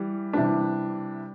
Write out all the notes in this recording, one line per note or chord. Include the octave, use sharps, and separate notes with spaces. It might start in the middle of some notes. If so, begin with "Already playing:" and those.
Already playing: E3 G3
C3 E3 G3 D4